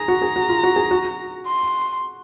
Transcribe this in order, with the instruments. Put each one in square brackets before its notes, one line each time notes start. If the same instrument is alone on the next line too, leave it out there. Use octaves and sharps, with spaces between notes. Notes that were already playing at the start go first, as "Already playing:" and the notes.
Already playing: [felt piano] G#4 [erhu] A#5
[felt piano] F#4
G#4
F#4
F4
F#4
G#4
F#4
[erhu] C6